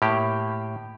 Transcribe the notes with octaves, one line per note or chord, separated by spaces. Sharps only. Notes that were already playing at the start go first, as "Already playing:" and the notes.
A2 A#3 G4